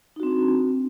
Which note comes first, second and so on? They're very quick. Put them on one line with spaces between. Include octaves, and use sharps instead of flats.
D#4 F#4 C4 D4